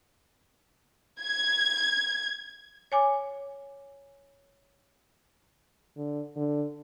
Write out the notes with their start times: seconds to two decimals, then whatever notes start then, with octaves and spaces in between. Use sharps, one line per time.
1.22 G#6
2.92 C#5 G#5 D6
5.97 D3
6.36 D3